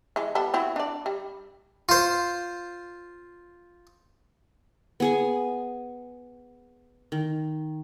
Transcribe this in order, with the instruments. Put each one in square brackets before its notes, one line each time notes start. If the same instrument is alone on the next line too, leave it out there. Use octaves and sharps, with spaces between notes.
[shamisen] E3 G#3
G3 B3 A4
C4 E4 F#4
D4 D5
G3
[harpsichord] F4 C5
[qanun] B3 G#4 G#5
D#3